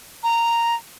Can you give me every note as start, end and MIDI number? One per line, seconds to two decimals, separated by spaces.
0.23 0.75 82